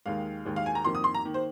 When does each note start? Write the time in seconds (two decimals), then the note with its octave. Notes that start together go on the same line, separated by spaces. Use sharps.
0.06 D#2 D#3 G#3 F5
0.45 D#2 D#3 G#3
0.56 F5
0.66 G#5
0.75 A#5
0.85 F2 D#3 A#3 C6
0.95 D#6
1.04 C6
1.15 A#5
1.24 D#3 A#3
1.34 C5